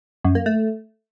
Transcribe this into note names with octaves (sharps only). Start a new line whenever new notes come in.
F#2
A#3
A3